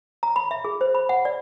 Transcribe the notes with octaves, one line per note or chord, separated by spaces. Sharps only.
A#5
B5
E5
G#4
C5
B5
F#5
D5